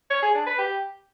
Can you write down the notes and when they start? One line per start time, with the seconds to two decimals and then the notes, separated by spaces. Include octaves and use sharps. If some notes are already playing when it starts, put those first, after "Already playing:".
0.11 C#5
0.23 G#4
0.35 D4
0.47 B4
0.59 G4